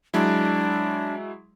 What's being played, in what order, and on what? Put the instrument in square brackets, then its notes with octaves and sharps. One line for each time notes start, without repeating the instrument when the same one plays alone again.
[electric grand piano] F#3 G#3 E4 [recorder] D4